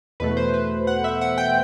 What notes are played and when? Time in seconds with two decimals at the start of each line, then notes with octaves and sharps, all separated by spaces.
0.20 E2 B2 A3 B4
0.37 C5
0.54 B4
0.87 F#5
1.04 E5
1.21 F#5
1.38 G5